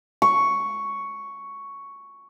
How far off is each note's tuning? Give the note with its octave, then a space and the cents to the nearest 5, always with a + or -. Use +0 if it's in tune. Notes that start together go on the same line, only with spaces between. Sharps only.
C#6 +5